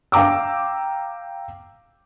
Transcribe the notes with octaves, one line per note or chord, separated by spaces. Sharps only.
F5 G5 A#5 D6 E6